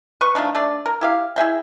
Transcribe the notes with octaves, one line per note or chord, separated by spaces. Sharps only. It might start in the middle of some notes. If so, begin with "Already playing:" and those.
B4 C#6
F3 A3 D4 D#4
A3 D4 D5
A#4
E4 G4 F5
E4 G#4 E5 G5